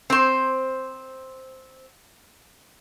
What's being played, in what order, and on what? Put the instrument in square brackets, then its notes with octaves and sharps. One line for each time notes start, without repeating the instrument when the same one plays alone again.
[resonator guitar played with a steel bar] C4 C5